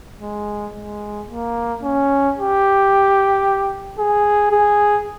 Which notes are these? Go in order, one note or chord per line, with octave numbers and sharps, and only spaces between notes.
G#3
G#3
A#3
C#4
G4
G#4
G#4